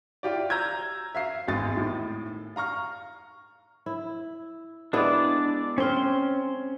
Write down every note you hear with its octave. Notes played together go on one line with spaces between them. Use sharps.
E4 F4 G4 D5
A#5 E6 G6 G#6
E5 F5 C7
G#1 E2 G#3 A6
A2 D#3
F5 A#5 C#6 F6
E4
G#3 B3 D4 E4 D5
C4 C#4 C5 F5 C6